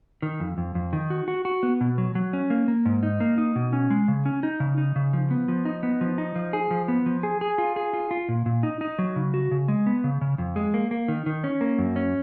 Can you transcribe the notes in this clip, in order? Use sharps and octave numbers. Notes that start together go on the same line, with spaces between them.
D#3
F2
F2
F2
D#3
F#4
F#4
F#4
B3
B2
F#3
F#3
C#4
A#3
A#3
G#2
D#4
A#3
D#4
B2
C#4
G#3
C#3
C#4
D#4
C#3
D#4
C#3
F3
B3
F3
D#4
B3
F3
D#4
F3
G#4
F3
B3
F3
G#4
G#4
F4
G#4
F4
F4
A#2
A#2
D#4
D#4
F#3
C#3
F#4
C#3
G#3
B3
C#3
C#3
F2
G#3
A#3
A#3
D#3
D#3
C#4
A#3
F#2
C#4